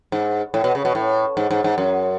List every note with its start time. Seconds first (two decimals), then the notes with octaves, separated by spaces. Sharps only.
0.12 G#2
0.54 A2
0.64 B2
0.75 C#3
0.85 B2
0.95 A2
1.37 G#2
1.51 G#2
1.64 G#2
1.78 F#2